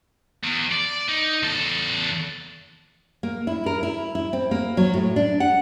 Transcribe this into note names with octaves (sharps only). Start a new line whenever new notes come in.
E2
D5
D#4
E2 A4
A#3
E4
A#4
E4
E4
C4
A#3
F#3
A2
D4
F#5